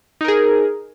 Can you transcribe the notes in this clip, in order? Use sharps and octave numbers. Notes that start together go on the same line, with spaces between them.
D#4 G#4 A#4